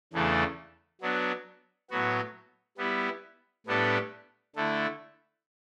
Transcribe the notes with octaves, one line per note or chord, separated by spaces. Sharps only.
E2 C#3 E3 A3 D4
F#3 B3 D4
A2 F#3 B3 F#4
G3 B3 E4
A2 G3 B3 D4 A4
D3 A3 E4